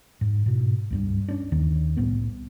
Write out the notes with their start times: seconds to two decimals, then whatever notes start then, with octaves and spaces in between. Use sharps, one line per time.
0.21 G#2
0.46 G#2 B2
0.91 C#2 G2 G3
1.28 C#4 D4
1.52 D#2 D#3
1.97 C2 A2 B3 C4